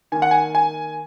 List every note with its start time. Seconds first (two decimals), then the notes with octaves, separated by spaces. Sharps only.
0.12 D#3 A#3 G#5
0.22 F#5
0.31 G#5
0.55 G#5